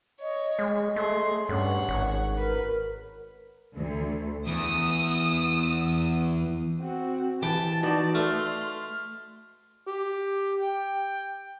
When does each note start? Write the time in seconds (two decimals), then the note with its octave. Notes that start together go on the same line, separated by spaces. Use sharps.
0.21 C#5 D#5
0.59 G#3
0.96 A3 G#4 C6
1.49 G2 C#4 C#5 F#5
1.88 G#1
2.38 A#4 B4
3.77 D2
4.47 E2 D#6 E6
6.79 C4 F#4
7.43 E3 G4 A5
7.83 D#4 F#4 B4 D5
8.15 A3 C6 F6
9.87 G4
10.61 G5